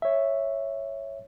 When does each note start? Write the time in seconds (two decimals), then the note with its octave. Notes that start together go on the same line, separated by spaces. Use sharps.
0.02 C#5 E5